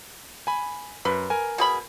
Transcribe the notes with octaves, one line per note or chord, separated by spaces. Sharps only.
G#5 B5
F#2 B4
A#4 G#5
B2 G#4 B5